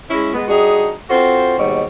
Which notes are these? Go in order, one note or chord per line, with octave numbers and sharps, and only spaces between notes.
G#3 C#4 E4
G#3 B3
G3 D4 D#4 F#4 G#4
C4 F4 F#4 A4 C5
D#2 G#2 B2 G3 C#5